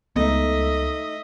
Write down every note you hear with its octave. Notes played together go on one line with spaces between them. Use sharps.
C#2 A3 B3 D#4 D#5 E5